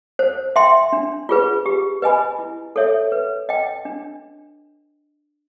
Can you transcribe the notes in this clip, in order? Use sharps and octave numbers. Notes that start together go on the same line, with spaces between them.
C5
E5 G5 C6
D4
F4 G#4 B4
G4
B4 D#5 G#5 B5
E4
A4 C#5 E5
B4
D#5 G5
D4